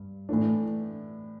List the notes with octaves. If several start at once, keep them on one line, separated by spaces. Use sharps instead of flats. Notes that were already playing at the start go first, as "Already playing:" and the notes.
Already playing: G2
A2 E3 A3 D4